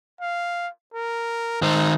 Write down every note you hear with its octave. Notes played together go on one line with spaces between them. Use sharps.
F5
A#4
D#3 D#4 C5